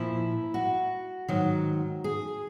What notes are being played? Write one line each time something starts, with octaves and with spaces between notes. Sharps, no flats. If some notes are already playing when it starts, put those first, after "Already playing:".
Already playing: A#2 F3 E4
F#4
G#2 D#3 F#3
G#4